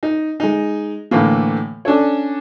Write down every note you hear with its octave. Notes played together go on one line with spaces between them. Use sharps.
D#4
G#3 D#4
A2 D3 E3 A3 A#3
C#4 D4 A4 C#5